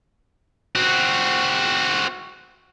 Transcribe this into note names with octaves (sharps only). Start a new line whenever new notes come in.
C4 F#4